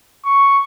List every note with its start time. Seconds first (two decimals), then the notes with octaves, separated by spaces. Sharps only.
0.25 C#6